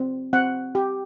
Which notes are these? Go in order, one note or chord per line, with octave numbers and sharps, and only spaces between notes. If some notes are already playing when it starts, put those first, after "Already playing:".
Already playing: C4
C4 F#5
G4